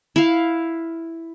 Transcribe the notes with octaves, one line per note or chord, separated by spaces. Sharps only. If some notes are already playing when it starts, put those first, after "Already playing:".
E4 F5